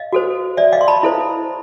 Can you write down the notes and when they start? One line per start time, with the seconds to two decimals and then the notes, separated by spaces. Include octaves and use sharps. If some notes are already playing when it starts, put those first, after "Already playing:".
Already playing: D#5 F5
0.13 F#4 A4 C5
0.57 D5 E5
0.73 D#5 F5
0.81 C6
0.88 A5 B5
1.03 E4 A4 C5